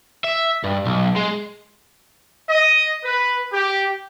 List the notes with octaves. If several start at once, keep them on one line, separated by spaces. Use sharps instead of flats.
E5
G2
B1
G#3
D#5
B4
G4